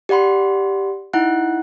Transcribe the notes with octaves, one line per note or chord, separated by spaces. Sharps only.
G4 D5 F#5 B5 C6
D#4 E4 F#5 F#6